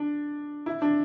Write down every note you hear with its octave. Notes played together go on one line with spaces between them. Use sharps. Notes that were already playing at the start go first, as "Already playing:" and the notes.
Already playing: D4
E4
D4